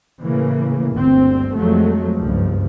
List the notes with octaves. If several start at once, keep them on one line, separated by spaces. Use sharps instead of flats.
A2 C#3 E3 A#3
G1 D2 C4
F2 F3 F#3 G#3 A3
F#1 C#2 G2 F3